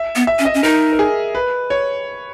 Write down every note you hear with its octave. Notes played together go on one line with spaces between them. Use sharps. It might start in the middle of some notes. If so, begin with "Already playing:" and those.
Already playing: E5
B3
E5
C#4
D#5
C#4
D#4 A#4
A#4
G#4
B4
C#5